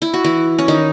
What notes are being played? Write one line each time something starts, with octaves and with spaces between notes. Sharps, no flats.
E4
F#4
E3 E4
C#4
D#3 D#4